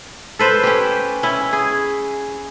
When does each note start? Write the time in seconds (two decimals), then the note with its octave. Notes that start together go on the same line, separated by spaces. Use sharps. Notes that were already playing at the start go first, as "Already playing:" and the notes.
0.39 A4 B4 C5
0.63 C#4 G4
1.23 C#4 E4
1.53 G#4